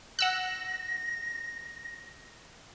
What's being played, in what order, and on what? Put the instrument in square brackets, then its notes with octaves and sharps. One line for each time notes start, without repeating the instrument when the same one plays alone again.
[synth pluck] F#5 E6 F#6 [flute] A#6